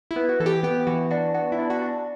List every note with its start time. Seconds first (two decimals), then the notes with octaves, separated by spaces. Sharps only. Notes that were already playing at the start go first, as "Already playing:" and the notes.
0.11 E4
0.16 B3
0.29 F#4
0.40 E3 A4
0.46 G4
0.63 B3 G4
0.87 E3 F#4
1.11 D4 F#4
1.34 B3 F#4
1.52 E4
1.59 D4
1.70 F#4
1.82 D4